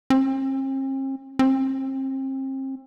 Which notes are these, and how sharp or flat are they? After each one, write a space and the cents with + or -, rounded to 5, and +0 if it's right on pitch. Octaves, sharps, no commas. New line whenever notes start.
C4 +45
C4 +35